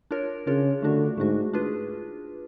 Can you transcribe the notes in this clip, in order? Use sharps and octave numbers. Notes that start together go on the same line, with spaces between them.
D4 F4 A#4 C#5
C#3 D4 F4 A#4 C#5
D3 A3 D4 F#4
G#2 A3 D4 F#4
D4 F4 G#4 B4